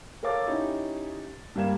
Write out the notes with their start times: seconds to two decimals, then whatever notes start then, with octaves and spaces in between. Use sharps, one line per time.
0.23 A4 A#4 C#5 F5 D6 A6
0.46 C#4 D#4 E4 G4
1.55 G2 G3 A#3 F5 G#6 E7